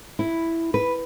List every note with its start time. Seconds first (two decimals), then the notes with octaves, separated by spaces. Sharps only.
0.19 E4
0.74 B4